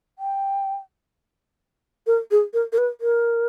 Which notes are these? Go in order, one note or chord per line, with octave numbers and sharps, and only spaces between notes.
G5
A#4
G#4
A#4
A#4
B4
A#4